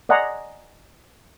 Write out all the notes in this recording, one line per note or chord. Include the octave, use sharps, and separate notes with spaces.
D5 D#5 F#5 G#5 A#5 C6